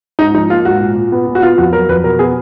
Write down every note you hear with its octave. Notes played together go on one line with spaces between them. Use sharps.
G#2 D#4
F3 D#4
A#3 F4
G#2 F#4
A#2
A#2
B3
A#2
F#4
B3 F4
F2 F#4
F#3 A#4
F2 B4
B2 A#4
B3 G#4